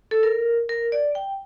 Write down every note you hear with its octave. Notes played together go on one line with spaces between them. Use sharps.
A4
A#4
A#4
D5
G5